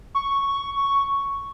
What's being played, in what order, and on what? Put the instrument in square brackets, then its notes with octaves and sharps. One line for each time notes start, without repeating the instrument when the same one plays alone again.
[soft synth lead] C#6